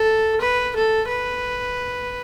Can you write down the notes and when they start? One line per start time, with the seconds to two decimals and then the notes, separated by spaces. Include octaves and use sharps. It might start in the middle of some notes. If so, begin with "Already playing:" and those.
Already playing: A4
0.41 B4
0.76 A4
1.08 B4